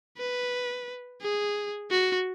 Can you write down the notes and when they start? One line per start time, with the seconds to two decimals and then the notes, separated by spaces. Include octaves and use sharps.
0.18 B4
1.21 G#4
1.90 F#4